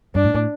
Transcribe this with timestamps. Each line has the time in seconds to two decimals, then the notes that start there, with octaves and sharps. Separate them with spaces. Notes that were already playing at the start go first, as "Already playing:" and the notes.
0.15 G2 D4
0.24 A2
0.35 A2